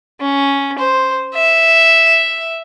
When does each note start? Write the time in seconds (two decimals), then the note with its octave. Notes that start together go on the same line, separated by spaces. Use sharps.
0.21 C#4
0.79 C5
1.34 E5